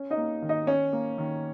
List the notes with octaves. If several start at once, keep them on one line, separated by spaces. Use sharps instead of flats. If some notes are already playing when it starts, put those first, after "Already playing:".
Already playing: C#4
D#4 D#5
A#3
D#3
D#4 D#5
C#4 C#5
A#3
D#3